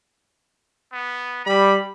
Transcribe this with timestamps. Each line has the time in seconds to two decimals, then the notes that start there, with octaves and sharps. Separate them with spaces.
0.93 B3
1.45 G3 B5